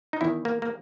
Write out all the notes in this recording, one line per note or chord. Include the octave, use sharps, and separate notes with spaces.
D#4
E2 D#3 E4
A#3
A#3